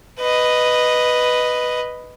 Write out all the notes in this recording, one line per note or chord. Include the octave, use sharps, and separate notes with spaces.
B4 D#5